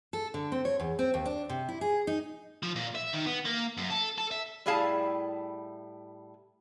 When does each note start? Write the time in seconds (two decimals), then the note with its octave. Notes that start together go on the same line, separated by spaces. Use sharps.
0.13 A4
0.34 D3
0.52 C4
0.65 C#5
0.80 E2
0.99 C4
1.14 D#2
1.25 D4
1.49 C3
1.69 E4
1.81 G#4
2.07 D#4
2.63 F3
2.76 A#2
2.95 E5
3.13 D#3
3.26 B3
3.45 A#3
3.77 F#2
3.90 A4
4.18 A4
4.31 E5
4.66 A2 G3 E4 G#4 F5 A5